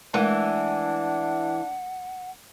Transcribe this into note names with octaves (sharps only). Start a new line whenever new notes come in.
E3 G#3 A3 D4 A#4 F#5